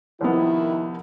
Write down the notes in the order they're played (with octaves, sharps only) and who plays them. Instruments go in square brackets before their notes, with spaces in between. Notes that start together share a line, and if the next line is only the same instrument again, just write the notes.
[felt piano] C2 F3 B3 [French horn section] D#3 E4